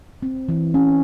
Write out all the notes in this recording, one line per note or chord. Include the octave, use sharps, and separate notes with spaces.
C4
E3
C#4